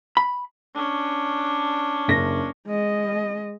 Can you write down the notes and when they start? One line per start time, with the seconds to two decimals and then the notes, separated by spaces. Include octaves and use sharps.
0.17 B5
0.75 C#4 D4
2.08 F#1 A#6
2.67 G#3 D#5